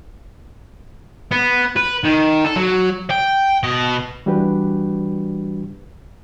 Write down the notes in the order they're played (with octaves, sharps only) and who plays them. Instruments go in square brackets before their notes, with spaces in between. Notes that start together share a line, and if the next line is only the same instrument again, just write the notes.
[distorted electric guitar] B3
B4
D#3
A4
F#3
G5
B2 D#5
[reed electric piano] E3 G3 D4 F#4 G4 B4